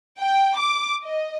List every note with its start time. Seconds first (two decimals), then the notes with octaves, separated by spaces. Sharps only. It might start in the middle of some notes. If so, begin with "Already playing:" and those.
0.18 G5
0.58 D6
1.04 D#5